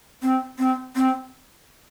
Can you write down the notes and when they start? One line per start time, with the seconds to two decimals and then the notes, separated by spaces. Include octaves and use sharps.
0.22 C4
0.58 C4
0.95 C4